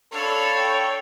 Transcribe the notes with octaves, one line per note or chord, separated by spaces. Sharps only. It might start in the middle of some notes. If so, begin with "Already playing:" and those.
D4 A4 C#5 F5 B5
G5